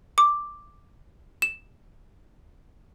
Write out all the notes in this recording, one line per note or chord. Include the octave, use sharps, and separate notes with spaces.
D6
E7